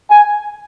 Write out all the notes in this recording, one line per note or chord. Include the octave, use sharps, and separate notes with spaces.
G#5